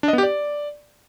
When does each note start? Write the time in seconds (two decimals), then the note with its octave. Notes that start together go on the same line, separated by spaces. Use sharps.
0.03 D4
0.08 D#5
0.13 B3
0.18 G4
0.23 D5